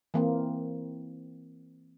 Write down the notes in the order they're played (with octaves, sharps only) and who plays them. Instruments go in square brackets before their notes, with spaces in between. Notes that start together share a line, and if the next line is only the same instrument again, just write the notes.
[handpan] E3 A#3 C4